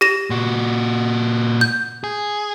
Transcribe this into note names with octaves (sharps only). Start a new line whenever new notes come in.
G4 A#6 E7
A#2 F#4
G6
G#4